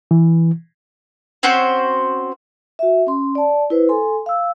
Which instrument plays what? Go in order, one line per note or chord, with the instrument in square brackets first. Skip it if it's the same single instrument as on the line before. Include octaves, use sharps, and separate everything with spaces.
[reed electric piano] E3
[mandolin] C4 C#4 F#4 C5
[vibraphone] F#4 E5
C#4 C6
D5 A5
E4 B4 C5
A4 G#5 C6
F5 E6